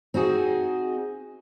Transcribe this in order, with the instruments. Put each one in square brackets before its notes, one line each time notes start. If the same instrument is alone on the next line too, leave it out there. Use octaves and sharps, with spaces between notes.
[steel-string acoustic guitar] C4 D#4 F#4 G#4